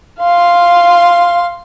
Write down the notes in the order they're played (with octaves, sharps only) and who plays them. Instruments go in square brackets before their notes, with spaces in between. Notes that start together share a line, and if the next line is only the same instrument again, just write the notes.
[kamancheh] F5 C6